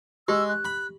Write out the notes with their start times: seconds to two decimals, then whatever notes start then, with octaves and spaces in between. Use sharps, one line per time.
0.28 G#3 G4 E6
0.48 F#6
0.65 B5